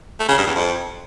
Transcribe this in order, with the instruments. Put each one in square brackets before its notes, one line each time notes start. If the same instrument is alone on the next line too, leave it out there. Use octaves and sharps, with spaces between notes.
[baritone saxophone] A3
C#3
G2
E2
F2